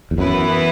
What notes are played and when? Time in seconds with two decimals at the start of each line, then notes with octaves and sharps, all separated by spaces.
0.11 E2
0.18 F#2 E3 B3 E4 B4